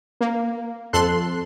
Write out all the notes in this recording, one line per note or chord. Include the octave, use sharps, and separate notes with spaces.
A#3
F2 A4 C6 F#6